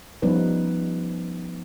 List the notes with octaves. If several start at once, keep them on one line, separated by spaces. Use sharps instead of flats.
F3 G3 B3 C#4 D#4 B4